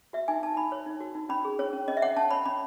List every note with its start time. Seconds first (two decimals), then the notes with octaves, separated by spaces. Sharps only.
0.13 F#4 E5
0.28 D#4 G#5
0.43 D#4 A5
0.57 D#4 B5
0.72 C#5
0.86 D#4
1.01 F#4
1.15 D#4
1.29 C#4 B5
1.45 G#4
1.59 C#4 C#5
1.73 C#4
1.88 C#4 D#5
1.97 E5
2.02 C#5 F#5
2.17 C#4 A5
2.31 C#5 B5
2.46 C#4 B5